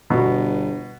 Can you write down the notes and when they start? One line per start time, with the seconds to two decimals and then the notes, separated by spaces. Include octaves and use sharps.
0.10 G1 B2